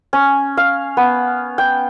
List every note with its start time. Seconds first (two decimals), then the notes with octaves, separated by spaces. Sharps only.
0.13 C#4
0.57 F5
0.97 B3
1.58 G5